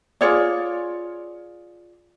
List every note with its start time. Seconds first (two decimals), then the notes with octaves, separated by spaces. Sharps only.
0.21 F4 G#4 C#5 D5